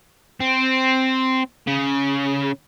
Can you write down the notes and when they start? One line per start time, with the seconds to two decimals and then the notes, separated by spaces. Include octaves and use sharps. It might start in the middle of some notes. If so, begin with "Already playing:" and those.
0.40 C4
1.67 C#3